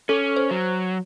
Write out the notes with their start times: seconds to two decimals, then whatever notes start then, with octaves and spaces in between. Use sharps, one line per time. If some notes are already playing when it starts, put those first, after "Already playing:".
0.09 C#4 A4
0.37 C5
0.51 F#3